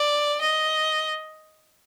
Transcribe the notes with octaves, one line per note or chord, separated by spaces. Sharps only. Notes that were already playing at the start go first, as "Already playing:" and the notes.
Already playing: D5
D#5